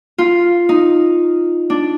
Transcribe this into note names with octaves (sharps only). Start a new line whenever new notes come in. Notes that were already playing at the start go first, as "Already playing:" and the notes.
F4
D#4
D4